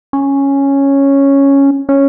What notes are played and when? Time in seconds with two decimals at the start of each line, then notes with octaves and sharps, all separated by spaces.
0.13 C#4
1.89 C#4